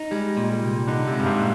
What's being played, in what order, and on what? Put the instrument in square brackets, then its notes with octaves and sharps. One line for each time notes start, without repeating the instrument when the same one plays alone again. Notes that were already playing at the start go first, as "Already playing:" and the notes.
Already playing: [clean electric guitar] D#4
[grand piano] G3 [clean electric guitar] G#3
[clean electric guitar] A#2
[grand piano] G3
[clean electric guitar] C2
[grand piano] D3 [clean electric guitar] D#4
[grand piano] C3
[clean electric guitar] G#3
[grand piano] G2
G#2
[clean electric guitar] A#2